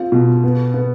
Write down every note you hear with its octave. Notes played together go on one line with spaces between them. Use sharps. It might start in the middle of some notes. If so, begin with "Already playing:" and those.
Already playing: C4 F4
B2
B3
B3